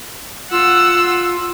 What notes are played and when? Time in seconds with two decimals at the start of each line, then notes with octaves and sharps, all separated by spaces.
0.51 F4 F#5 E6